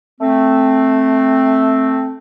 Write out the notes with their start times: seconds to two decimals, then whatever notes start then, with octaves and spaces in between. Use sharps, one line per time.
0.21 A3 C4